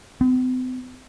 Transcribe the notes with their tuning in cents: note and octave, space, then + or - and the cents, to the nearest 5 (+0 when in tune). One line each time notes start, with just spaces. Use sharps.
C4 -45